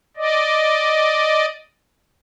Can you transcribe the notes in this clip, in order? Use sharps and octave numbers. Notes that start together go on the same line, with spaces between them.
D5 D#5